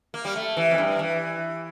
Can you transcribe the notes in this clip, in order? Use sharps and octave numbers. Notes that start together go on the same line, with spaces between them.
A#3
G3
A3
E3
F2
G2
E3